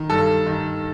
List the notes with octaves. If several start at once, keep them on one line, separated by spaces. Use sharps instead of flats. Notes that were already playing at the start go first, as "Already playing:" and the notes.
Already playing: D#3
G2 A4
D#3